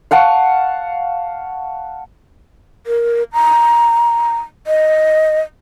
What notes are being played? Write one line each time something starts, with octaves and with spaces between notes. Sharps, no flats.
F5 F#5 A5 C#6
A#4
A#5
D#5